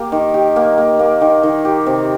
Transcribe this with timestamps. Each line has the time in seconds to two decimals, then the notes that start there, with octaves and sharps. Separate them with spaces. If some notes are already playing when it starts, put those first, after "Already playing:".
Already playing: A#3 G4
0.12 D#3
0.34 G4
0.56 A#3
0.78 A#3
0.99 A#3
1.21 D#3
1.43 D#3
1.65 G4
1.86 C3